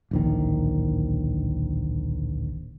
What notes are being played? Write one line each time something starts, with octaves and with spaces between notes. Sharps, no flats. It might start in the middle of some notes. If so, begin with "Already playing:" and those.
D1 A#1 D#3